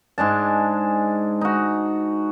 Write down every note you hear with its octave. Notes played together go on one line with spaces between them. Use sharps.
G#2 G#3 D4 A5
D#4 F#4